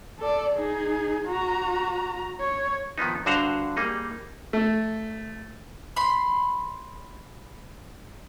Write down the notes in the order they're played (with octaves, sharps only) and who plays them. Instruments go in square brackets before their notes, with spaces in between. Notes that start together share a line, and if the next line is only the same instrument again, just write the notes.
[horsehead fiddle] A4 D5
D#4 G#4
F#4 A#5
C#5
[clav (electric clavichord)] D#3 F3 B3 D#4
G2 D3 F#4 C5 F#5 A#5
G3 A#3 D#4 G#4
[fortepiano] A3
[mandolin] B5 C6